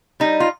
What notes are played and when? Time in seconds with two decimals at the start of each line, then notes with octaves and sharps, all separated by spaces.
0.20 G3 D#4
0.40 F4